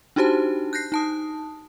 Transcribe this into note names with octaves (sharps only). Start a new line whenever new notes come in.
D4 D#4 F#4 G4 C5 A5
F#6 G6 A#6 C7
D#4 A5 D#6